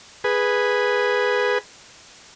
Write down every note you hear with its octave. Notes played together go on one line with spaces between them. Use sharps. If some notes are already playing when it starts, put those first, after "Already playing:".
G#4 B4